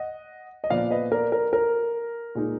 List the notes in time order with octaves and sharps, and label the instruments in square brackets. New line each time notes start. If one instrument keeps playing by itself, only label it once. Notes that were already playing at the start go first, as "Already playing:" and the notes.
Already playing: [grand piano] D#5 F#5
D#5
A#2 F3 B3 D5 F5
B4 D#5
A#4 D5
A#4
A#4
A#2 G#3 D#4